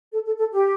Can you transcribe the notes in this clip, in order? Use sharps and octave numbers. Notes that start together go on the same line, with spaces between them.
A4
A4
A4
G4